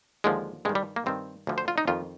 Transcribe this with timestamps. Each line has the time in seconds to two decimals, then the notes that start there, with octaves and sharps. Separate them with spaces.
0.24 D#2 D3 F3 G#3
0.65 G2 G#3
0.69 D#3
0.75 G3
0.96 A#3
1.06 G2 D#3 C4
1.47 D2 D3 F3
1.58 C5
1.68 F4
1.78 D#4
1.88 F2 D#3 F4